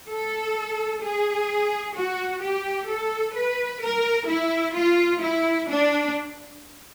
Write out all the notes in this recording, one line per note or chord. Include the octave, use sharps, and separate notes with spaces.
A4
G#4
F#4
G4
A4
B4
A#4
E4
F4
E4
D4